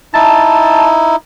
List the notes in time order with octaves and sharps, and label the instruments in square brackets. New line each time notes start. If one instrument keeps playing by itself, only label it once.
[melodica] D#4 E4 [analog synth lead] A5